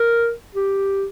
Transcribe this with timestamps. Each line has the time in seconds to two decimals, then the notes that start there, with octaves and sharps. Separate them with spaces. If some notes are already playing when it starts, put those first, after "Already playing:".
Already playing: A#4
0.55 G4